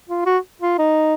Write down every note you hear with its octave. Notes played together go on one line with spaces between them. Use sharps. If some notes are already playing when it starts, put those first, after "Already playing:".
F4
F#4
F4
D#4